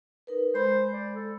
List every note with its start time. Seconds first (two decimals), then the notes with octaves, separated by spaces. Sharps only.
0.27 D#4 A#4 B4
0.54 G#3 C5 B5
0.93 D5
1.14 A4